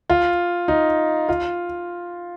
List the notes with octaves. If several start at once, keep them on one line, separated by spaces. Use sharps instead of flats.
F4
D#4
F4